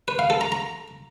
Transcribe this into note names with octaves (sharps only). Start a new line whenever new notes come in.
B4
F5
A4
A#5
A#5